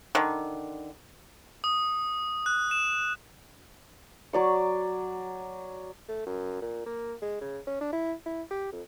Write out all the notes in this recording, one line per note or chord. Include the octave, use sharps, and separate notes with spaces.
D3 D#3
D#6
F#6
E7
F#3 D5 C#6
A3
F#2
A#2
A#3
G#3
C#3
C#4
D4
E4
E4
G4
F2